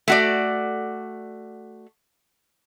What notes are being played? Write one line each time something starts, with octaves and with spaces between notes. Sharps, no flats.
A3 F#4 D5